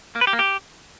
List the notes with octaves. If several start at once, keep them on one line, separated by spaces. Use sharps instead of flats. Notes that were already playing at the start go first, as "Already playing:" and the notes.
A#3
B4
G4
A#3
G4